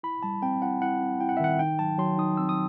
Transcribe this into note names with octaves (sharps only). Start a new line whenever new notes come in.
E4 B5
G3 A5
C4 G5
E4 F#5
E4 F#5
C4
E4 G5
F#5
E5
D#3 F#5
D#4 G5
F#3 A5
F#3 C6
D#4 D#6
C4 E6
D#6